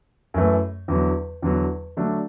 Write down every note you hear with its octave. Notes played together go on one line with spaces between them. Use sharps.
F#2 E3 A3
E2 D3 F#3
E2 D3 F#3
D3 F#3 A3 D4